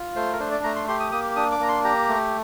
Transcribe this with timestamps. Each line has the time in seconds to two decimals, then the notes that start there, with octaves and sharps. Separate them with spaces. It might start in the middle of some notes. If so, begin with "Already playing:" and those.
Already playing: F4
0.16 A3 C5
0.33 A#4
0.40 D4 C5
0.51 D5
0.64 A3 A#5
0.76 C6
0.88 G4 C6
1.00 D#6
1.12 A#3 D#6
1.36 D4 D#6
1.52 D6
1.60 A#3 A#5
1.69 C6
1.84 G4 A#5
2.09 A3